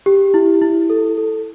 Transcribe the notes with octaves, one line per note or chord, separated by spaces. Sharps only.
G4
E4
E4
A4
A4